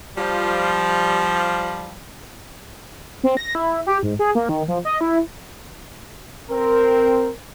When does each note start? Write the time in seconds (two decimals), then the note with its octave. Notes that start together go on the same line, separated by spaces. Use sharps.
0.17 F3 G3
3.24 C4
3.37 A#6
3.55 E4
3.87 G4
4.03 G#2
4.19 G#4
4.35 A#3
4.49 D#3
4.68 F3
4.85 D#5
5.01 E4
6.51 C4 A#4